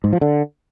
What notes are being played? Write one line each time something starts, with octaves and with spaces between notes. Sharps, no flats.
G#2
F3
D3